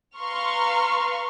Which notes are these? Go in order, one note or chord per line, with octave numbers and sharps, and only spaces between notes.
B4 F5 A#5 C6 C#6 F6